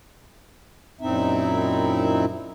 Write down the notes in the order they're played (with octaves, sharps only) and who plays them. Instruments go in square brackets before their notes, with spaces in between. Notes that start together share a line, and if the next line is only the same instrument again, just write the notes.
[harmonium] F#2 A#2 C4 D#4 E4 E5